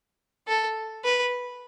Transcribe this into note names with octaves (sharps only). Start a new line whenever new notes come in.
A4
B4